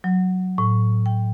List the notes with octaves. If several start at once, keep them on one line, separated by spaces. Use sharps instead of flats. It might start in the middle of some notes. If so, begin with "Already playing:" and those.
F#3
A2
G5